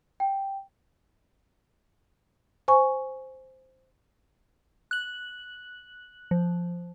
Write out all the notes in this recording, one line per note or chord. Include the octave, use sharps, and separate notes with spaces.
G5
C5 G#5 C#6
F#6 F#7
F3